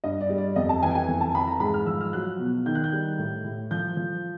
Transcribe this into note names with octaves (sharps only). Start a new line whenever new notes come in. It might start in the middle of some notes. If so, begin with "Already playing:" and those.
G2 D#5
D5
G3
D5
F2 D#5
A5
E3 G#5
G5
G#5
F2
A5
E3 B5
A5
A#5
G#2 B5
F6
F3 E6
F6
F#3 F#6
B2
D#3 G6
F#6
G6
G3
A2
A2
F3 G6
F3